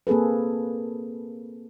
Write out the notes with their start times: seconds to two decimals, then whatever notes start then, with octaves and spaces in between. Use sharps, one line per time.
0.07 A#3 C4 G#4 A4 B4